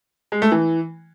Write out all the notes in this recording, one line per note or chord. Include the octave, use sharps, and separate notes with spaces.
G#3
A3
E3